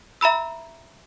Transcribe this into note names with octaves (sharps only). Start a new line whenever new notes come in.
E5 A#5 B5 E6